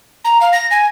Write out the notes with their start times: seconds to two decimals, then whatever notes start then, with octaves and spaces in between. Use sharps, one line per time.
0.25 A#5
0.41 F5
0.53 A#6
0.71 G#5